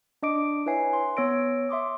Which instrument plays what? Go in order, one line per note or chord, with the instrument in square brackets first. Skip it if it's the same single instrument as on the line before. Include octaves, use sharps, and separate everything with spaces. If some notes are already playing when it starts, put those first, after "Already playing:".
[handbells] D4 D#5 D6 D7
E4 B4 C#5 E5 G#5 C7
C6
B3 C#5 E6 A#6 D7
E5 C6 D6 D#6